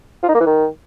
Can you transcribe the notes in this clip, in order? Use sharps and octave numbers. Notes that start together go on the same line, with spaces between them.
F4
D#4
A#3
E3
D#3